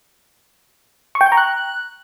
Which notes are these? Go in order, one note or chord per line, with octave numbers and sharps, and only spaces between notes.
C#6
G5
G6
A#5
F#6